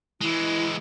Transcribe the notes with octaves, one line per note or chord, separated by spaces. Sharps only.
E3 G#3 E4